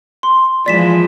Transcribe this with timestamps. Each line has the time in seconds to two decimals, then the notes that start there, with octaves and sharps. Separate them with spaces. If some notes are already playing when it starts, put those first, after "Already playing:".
0.23 C6
0.66 E3 F3 G#3 D5 B6 E7